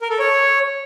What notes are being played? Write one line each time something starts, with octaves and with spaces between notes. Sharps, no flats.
A#4
A4
C#5